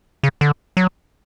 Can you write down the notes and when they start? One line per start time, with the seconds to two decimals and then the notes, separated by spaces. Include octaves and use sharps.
0.23 C#3
0.41 D3
0.77 F#3